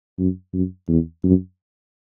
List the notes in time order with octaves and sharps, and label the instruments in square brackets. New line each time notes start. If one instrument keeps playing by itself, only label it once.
[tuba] F#2
F#2
E2
F#2